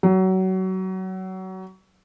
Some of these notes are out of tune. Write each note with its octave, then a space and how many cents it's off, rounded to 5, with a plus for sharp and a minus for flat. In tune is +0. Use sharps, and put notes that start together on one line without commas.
F#3 +25